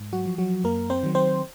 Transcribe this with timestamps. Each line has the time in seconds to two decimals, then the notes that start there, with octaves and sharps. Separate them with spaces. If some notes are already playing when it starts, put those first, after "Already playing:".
Already playing: G#2
0.13 F#3 F#4
0.25 F3
0.38 F#3 F#4
0.64 F#2 A#3 A#4
0.90 C4 C5
1.03 D#3 F#3
1.15 C4 C5